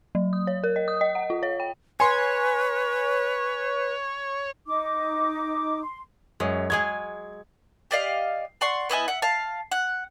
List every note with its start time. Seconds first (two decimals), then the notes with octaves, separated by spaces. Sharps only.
0.15 F#3
0.33 D#6
0.47 C#5
0.64 A#4
0.76 D#5
0.88 D#6
1.01 D#5
1.15 F#5
1.30 F4
1.43 C#5
1.60 G5
2.00 B4 C#5 G#5 C6
4.67 D#4 D6
5.83 C6
6.40 F#2 G#3 C#5
6.70 F#3 G#3 G#4 G#6
7.91 G4 D5 D#5 F5
8.61 D5 F#5 C6 C#6
8.89 B3 E4 D#5 G#5
9.08 E5 F#5
9.22 F5 A5
9.71 F#5